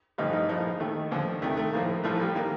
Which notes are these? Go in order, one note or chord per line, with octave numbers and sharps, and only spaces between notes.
A1 G2 D3 F3 D#4
D#4
A#1 A2 F3 D#4
D#2 D#3 A3
D#2 D3 F3
D2 C3 D#3 A3
A3
A#1 A2 F3 A#3
A1 A2 F3 A3
G3
D#3 A#3